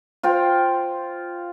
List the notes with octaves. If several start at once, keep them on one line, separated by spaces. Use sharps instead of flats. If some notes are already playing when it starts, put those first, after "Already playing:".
F4 C5 G5